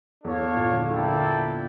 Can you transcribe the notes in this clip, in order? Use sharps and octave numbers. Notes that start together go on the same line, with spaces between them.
E2 D4 A4 C#5 F5
E2
A#2
D3
D3 A#3 E4 A4 D5 G5